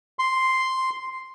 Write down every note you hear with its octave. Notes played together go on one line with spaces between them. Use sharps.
C6